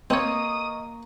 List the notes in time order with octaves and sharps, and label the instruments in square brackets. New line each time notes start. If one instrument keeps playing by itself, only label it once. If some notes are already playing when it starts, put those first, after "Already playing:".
[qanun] A#3 [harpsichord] C4 C#5 [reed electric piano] D#5 C#6 [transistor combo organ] D#6